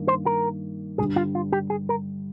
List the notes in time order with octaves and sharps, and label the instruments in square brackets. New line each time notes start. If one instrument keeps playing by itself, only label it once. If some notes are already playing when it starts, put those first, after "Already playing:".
Already playing: [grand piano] G2 D#3 A#3
[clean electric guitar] C5
A#4
[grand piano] G2 D3 G3 [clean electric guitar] G#4
[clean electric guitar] F4
F4
G4
G#4
A#4